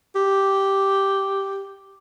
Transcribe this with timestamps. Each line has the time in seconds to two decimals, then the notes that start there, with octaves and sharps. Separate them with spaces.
0.15 G4